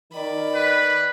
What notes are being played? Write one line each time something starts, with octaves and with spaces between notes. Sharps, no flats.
D#3 D5 B5
B4